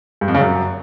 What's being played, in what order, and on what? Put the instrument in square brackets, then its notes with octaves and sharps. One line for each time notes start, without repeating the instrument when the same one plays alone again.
[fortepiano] G2
F2
C#3
F#2